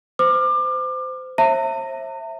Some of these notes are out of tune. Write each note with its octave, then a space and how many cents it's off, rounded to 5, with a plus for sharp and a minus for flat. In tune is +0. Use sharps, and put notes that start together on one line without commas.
C5 -30 D6 +30
C5 +40 E5 +0 A#5 -45